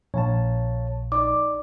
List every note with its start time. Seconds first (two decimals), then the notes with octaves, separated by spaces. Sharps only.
0.14 A#1 C#5 F5 A5
1.12 D#4 D5 D6